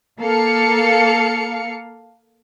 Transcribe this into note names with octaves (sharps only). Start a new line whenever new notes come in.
A#3 A4 F5 C#7